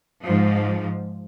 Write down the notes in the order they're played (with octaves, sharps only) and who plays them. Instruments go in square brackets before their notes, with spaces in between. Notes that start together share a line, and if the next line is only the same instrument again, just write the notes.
[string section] G#2 F3